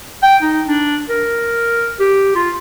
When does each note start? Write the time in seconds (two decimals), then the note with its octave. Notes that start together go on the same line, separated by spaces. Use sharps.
0.22 G5
0.42 D#4
0.67 D4
1.09 A#4
2.00 G4
2.35 F4